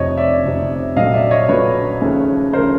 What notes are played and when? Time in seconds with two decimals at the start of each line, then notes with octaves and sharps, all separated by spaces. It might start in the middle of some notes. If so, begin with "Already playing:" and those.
Already playing: F1 F2 C3 C#5 D#5
0.17 D5 E5
0.44 F1 F2 C3
0.96 A#1 A#2 F#3 A3 D#5 F5
1.14 D5 E5
1.31 C#5 D#5
1.48 A#1 A#2 F#3 A3 B4 C#5
2.01 D#2 C#3 F3 A3
2.53 C#3 F3 A3 A#4 C5